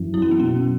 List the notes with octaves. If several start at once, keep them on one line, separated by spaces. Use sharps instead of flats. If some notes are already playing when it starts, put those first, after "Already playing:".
Already playing: F#2 E3
F#3 E4
C#4
B3
B2 C#4